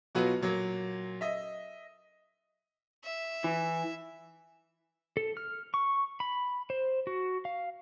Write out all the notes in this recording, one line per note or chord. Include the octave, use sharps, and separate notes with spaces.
B2 F#3 F4 F#4 B4
A#2 F#3 A#3
D#5 E5
E5
E3
A4
F6
C#6
B5
C5
F#4
F5